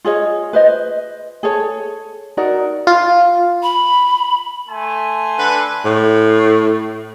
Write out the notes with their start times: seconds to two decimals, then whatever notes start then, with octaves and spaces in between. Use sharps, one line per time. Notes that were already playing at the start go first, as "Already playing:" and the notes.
0.05 F4 G#4 C#5 D#5
0.53 B4 C5 D#5
1.43 G#4 A4 C#5
2.37 D#4 F#4 A#4 D5
2.87 F4
3.63 B5
4.68 A3 G#5 C6
5.37 D3 B4
5.85 A2